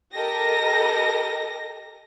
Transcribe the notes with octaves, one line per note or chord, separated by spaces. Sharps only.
G4 A4 A#4 D#5 A#6